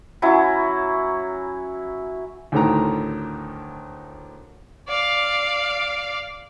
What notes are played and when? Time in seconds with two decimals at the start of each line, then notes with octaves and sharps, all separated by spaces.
0.22 F#3 C#4 E4
2.52 D2 A2 D3 D#3 A#5
4.88 D5 F5